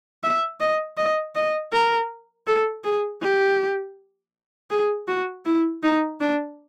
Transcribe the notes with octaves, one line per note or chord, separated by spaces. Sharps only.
E5
D#5
D#5
D#5
A#4
A4
G#4
G4
G#4
F#4
E4
D#4
D4